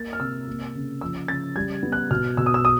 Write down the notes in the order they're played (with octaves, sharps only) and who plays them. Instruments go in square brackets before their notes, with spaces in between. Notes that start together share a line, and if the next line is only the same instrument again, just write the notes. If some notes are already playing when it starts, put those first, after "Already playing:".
Already playing: [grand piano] A#3 A6
F6
C3 E6
A#3
C#3
F3 E6
C#3 A6
G3 G#6
B3
F#6
B2 F6
B2 E6
D#6
E6
D#6